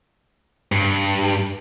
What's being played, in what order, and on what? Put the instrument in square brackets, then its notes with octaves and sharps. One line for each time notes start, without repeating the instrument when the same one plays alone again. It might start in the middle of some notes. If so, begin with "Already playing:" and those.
[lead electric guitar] G2